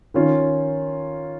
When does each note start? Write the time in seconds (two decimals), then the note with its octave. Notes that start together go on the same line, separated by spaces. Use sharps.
0.14 D#3 C#4 F4